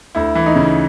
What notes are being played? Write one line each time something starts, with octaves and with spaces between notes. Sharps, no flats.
D2 E4
E3
D#4
C#3